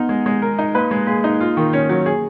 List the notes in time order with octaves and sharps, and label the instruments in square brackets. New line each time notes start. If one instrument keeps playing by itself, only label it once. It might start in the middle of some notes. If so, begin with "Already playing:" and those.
Already playing: [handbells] B3 [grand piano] D#4
[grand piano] G#3
G#3
A#4
D#4
[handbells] A#3 [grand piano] B4
[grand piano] G#3
[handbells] A#3 [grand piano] G#4
[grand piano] D#4
F4
D#3
C#4
F#3
G#4